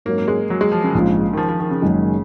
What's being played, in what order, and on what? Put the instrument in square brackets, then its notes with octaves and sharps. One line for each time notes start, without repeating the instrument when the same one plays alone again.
[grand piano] G#2 F#3 C#4 [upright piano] A#3
[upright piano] A#3
G#3
F#3
G#3
F3
C#3
[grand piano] A#1 G#2 F3 G#3
[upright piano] D#3
F3
F3
D#3
C#3
[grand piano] F#1 F#2 D#3 G#3